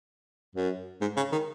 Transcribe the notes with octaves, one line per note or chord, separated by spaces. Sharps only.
F#2
G#2
C#3
D#3